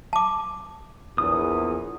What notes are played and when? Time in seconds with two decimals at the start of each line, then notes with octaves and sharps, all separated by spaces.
0.13 A5 D6
1.18 A#1 E2 D#6